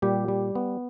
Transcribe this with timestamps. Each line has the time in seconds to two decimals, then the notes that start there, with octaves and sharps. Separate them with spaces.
0.02 A#2 G3 G4
0.28 G3
0.55 B3